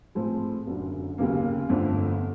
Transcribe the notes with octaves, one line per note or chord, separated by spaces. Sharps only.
A2 F3 G#3 C4
F#1 F#2 D3
D#2 C#3 F#3 A#3
G1 F2 D3 F3 A3